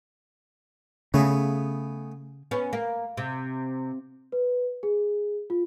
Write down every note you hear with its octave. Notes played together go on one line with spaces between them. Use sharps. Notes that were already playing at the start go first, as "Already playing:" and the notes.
C#3 A3 B3 G#4
B3 C#4
A#3
C3
B4
G#4
F4